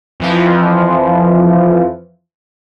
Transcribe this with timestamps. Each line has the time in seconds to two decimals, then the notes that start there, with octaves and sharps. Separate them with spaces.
0.20 F2 E3 F3